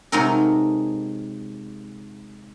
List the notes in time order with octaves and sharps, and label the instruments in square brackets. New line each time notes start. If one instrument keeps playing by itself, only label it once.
[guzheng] C3 F#3 G#3 D#4 A4 A#4